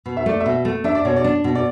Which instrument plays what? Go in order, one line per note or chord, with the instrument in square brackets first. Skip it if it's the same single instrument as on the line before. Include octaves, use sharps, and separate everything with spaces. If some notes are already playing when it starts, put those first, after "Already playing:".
[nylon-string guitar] B2
[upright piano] E5
[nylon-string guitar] A3 [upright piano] D5
[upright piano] E5
[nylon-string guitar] B2
A3
[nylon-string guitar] D4 [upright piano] E5
[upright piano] D5
[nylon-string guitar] B2 [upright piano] C#5
[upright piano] D5
[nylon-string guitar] D4
B2
[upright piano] D5